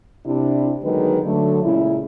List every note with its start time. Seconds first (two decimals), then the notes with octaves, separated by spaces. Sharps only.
0.25 C3 D4 E4
0.82 D3 D#3 F#3 G#3 B3 B4
1.24 D3 F#3 A3
1.63 A#2 C#3 G#3 E4